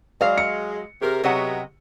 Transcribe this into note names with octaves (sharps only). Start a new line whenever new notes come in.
F#3 G#3 D5 F5
C#7
C3 G4 G#4 A#4
C3 F#3 B3 C#5 D#5 F#5